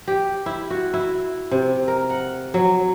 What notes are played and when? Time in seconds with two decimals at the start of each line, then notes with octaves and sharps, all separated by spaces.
0.08 G4
0.46 E4
0.70 F#4
0.94 E4
1.51 C3
1.88 A#4
2.10 F#5
2.54 F#3